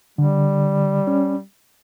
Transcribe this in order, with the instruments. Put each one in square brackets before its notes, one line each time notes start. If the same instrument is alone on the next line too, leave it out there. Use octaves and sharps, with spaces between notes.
[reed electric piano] D3 [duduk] G3
[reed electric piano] C#4